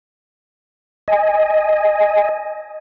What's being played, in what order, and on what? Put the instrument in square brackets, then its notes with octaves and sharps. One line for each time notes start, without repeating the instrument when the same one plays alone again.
[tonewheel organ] D#5 G#5